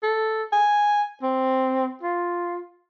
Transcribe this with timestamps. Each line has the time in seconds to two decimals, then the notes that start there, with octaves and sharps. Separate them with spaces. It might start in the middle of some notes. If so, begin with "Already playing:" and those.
0.03 A4
0.53 G#5
1.22 C4
2.03 F4